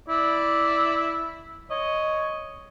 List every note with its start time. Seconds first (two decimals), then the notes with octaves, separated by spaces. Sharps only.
0.09 E4 D5
1.71 C#5 D#5